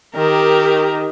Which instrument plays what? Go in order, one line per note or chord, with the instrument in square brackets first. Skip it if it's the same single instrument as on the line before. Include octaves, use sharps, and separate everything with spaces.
[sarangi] D#3 [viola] G4 A#4